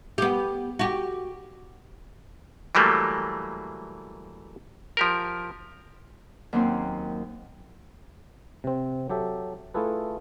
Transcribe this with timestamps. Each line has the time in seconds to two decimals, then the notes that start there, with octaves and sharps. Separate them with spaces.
0.18 B3 G4
0.79 F#4 G4
2.75 E3 F#3 G3 A3 A#3
4.97 F3 G4 A#4
6.53 D#2 F#3 A#3 C4 C#4 C6
8.64 C3 C4
9.10 F#3 G4 A4 E5
9.74 A3 E4 F4 G#4 A4 B4